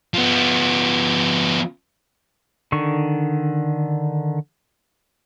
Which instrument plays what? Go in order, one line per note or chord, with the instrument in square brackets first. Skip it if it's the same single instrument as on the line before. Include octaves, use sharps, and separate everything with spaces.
[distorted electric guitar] F3 B3
[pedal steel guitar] D3 D#3 C#6